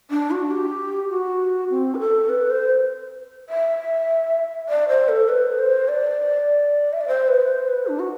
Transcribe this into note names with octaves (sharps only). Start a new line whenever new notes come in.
D4
F#4
G4
F#4
C4
B4
A4
B4
C5
E5
D5
C5
A4
B4
C5
D5
E5
D5
C5
B4
C5
B4
D4
F#4